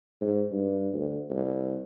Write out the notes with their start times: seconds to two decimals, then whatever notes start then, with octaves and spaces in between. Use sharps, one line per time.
0.21 G#2
0.52 G2
0.94 D2
1.30 C2